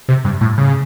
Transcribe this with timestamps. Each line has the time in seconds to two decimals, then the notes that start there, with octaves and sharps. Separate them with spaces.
0.09 C3
0.25 G2
0.41 A2
0.58 C#3